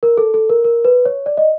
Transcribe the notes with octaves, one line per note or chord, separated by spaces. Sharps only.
A#4
A4
A4
A#4
A#4
B4
C#5
D5
D#5